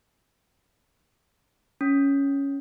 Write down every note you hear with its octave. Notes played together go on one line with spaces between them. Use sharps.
C#4